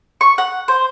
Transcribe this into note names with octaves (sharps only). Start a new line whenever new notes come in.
C#6
F#5
C5